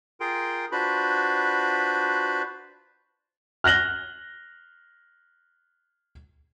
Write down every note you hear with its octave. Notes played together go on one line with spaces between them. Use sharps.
F4 G#4 A#4 G5 C6
D4 F4 F#4 B4 C5 B5
F6 F#6 A#6 F#7 G7